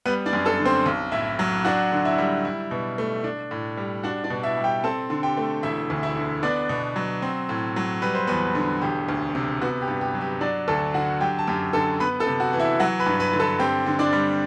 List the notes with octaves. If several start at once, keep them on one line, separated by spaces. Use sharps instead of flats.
G3 B3 B4
D4 D5
F#2
A4 A5
D3
C4 C5
B1
A2 E4 E5
F#3
D4 F#4 F#5
D3
E4 E5
G3
E4
B2
A3
D4
A2
G3
D4 F#4 F#5
D4 D5
B2
E4 E5
G3
G4 G5
C4 A4 A5
D3
G4 G5
A3
E1 E4 E5
D2
E4 E5
D3
B3 D4 D5
B2
F#3
C4
A2
F#3
G3 B4
C5
E2 B3 B4
D3
E1 G4
D2
C3
B3 F#4
G4
G2
G4
F#3
G4
F#3 D4 D5
D2 A4 A5
D3 F#4 F#5
F#3 G4 G5
A5
F#2 G4 G5
D3 A4 A5
B3 B4 B5
A4 A5
C3
F#4 F#5
E3
E4 E5
F#3 F#4 F#5
B4 B5
G2
B4 B5
D3
A4 A5
C4 G4 G5
D3
D4 D5
G3